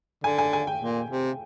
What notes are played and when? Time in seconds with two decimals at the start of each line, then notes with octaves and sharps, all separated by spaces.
0.24 D3 G#5
0.38 G#5
0.53 G#5
0.67 G5
0.82 A#2
1.10 C3